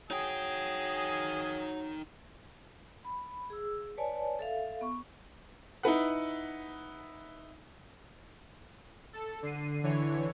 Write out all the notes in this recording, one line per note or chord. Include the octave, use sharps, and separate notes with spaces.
F#3 D#4 G#4 G5
B5
G#4 E6
B4 C#5 D5 G#5 A5
A4 E5 F5
B3 C#6
D#4 E4 B4 F#5
A4
D3 C7 D#7
D3 E3 C#5